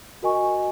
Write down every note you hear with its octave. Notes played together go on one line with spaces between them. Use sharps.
F#4 A#4 D#5 G#5 C#6